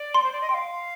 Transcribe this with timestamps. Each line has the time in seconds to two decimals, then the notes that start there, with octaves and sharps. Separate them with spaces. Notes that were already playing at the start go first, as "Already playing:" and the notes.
Already playing: D5
0.14 C6
0.23 C5
0.32 D5
0.41 D#5
0.49 G5 C6
0.54 F5